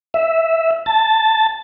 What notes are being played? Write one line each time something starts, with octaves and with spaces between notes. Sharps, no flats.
E5
A5